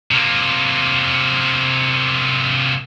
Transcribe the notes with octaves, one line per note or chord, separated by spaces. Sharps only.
C3 A#3